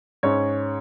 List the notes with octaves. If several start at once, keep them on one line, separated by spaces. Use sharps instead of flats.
G#2 G#3 C#4 C#5